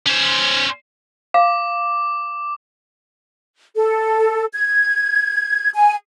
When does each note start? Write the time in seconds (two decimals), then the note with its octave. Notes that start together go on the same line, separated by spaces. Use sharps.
0.06 C#4 C5
1.34 F5 D6
3.76 A4
4.54 G#6
5.74 G#5